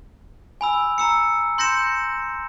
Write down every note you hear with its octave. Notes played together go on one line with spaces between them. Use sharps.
G#5 B5 E6
A#5 E6 C#7
C6 G6 A#6 C#7 E7